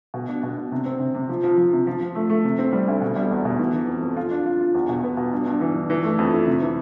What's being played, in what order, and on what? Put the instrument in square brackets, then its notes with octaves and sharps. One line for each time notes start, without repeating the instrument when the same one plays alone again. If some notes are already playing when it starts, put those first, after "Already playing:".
[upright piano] B2
D4
B2
D4
C3
C4
C3
C3
F3
F3
F3
C3
F3
F3
A3
A3
C3
C4
G3
D2
B2
G3
E2
B2
E3
E3
F2
F2
F4
D4
F4
F4
E2
B2
B3
B2
G2
G2
E3
G2
E3
A3
F2
E4
C3
E3